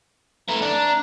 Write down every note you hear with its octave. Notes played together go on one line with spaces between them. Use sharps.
E3 A3 A#5
D4